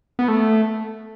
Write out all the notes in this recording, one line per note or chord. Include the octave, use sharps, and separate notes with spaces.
B3
A3